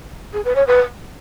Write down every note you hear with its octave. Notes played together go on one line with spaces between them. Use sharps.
G#4
B4
C#5
B4